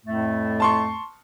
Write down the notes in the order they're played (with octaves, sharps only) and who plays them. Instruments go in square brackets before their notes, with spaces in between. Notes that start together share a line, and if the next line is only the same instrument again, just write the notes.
[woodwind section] F2 A2 A3
[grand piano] A5 C6 C#6